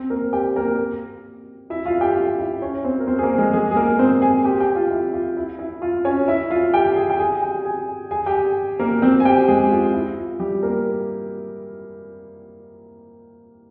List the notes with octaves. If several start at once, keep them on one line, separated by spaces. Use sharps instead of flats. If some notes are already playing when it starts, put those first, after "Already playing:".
Already playing: C4 C5
A#3 A#4
G4 G5
A#3 A#4
E4 E5
F4 F5
G4 G5
F4 F5
E4 E5
C#4 C#5
C4 C5
A#4
C4 C5
G#4
A#3 A#4
G#3 G#4
G#3 G#4
G#4
A#3 A#4
C4 C5
G#4 G#5
G4 G5
G4 G5
F4 F5
E4 E5
F4
E4
E4
F4
C#4 C#5
E4 E5
F4 F5
G4 G5
G#4 G#5
G5
G#4 G#5
G4 G5
G#4 G#5
G#4 G#5
G4 G5
A#3 A#4
C4 C5
G#5
G4 G5
G#3 G#4
G4
F4
E4
F4
G3 G4
A#3 A#4